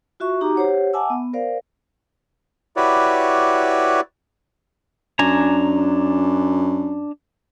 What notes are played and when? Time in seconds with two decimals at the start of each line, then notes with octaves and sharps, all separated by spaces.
0.20 F4 F#4 E5 C#6
0.41 D#4 F#4 G4 A#5 D6
0.56 G4 C5 C#5 F#5
0.93 E5 F#5 G#5 A5 D6 E6
1.10 B3
1.33 A#4 C5 D5 F5
2.77 E4 F#4 G4 B4 C#5 D5
5.19 F#2 D4 G#5 A#5